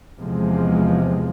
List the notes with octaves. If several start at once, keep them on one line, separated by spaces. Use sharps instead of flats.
E2 C3 F3 G#3